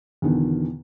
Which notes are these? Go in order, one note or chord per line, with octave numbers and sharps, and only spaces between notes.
E2 B2 D3 D#3